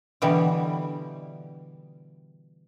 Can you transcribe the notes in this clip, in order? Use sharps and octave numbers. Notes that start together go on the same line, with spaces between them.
B2 D3 E3 G3